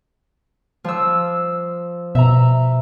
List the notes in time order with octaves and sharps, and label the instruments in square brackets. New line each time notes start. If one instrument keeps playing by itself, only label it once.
[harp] F3 E6
[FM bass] B2 [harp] E5 A#5